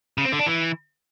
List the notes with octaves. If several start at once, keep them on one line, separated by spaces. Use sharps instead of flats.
C#3
C4
D3
D4
E3